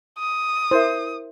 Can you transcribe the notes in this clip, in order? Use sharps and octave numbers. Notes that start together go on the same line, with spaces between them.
D#6
E4 A#4 C5 E5